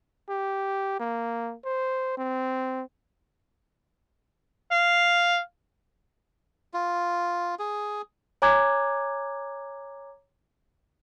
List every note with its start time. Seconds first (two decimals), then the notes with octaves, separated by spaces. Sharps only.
0.29 G4
1.00 A#3
1.65 C5
2.17 C4
4.71 F5
6.74 F4
7.59 G#4
8.42 C#5 G#5 A#5 D6 F#6 G#6